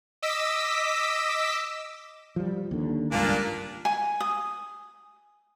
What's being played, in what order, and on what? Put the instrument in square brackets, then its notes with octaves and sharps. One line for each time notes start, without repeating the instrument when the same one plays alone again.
[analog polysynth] D#5 D6 E6 B6
[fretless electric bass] F3 G3
D#2 D3
[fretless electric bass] G#1 C#2 G2 [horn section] A#2 A#3 D4
[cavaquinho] G#5
D#6